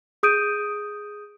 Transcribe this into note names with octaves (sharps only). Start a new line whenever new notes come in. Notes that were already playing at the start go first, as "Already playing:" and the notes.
G#4 D#6 G6 D7 D#7